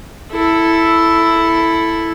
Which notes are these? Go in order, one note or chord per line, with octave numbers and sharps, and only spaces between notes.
E4 A4